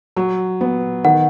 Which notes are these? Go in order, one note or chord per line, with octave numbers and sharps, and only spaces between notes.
F#3
B3
D#3 F#5